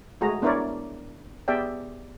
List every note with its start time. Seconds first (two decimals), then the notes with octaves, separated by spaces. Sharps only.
0.21 G#3 A3 F#4 G#4 A#5
0.42 B3 D4 E4 A#4 C#5 D5
1.48 B3 G4 G#4 D5 E5 G5